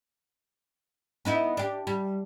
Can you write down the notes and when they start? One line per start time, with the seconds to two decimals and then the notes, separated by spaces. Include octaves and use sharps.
1.25 B3 D#4 E4
1.57 D4 G4
1.87 G3